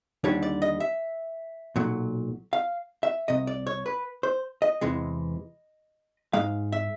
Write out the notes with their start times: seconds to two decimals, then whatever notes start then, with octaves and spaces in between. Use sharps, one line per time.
0.24 D#2 D3 G3 C#5
0.43 D5
0.62 D#5
0.80 E5
1.76 B1 A#2 F#3
2.53 F5
3.03 E5
3.28 C2 C3 D#5
3.47 D5
3.67 C#5
3.86 B4
4.23 C5
4.62 D#5
4.81 E2 C3 E3 G#3
6.33 G#2 D#3 G#3 F5
6.72 E5